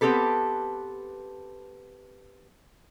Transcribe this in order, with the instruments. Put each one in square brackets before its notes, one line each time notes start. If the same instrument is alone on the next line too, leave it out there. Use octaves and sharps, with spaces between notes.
[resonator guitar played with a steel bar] B3 C4 G4 A4 B4